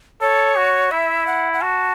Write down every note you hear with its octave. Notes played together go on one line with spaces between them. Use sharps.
A4 C#5
F#4
E4 E5
F#5
F#5
F#4 A5